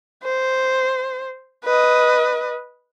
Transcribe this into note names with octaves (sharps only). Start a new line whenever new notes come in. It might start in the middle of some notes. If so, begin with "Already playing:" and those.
C5
B4 D#5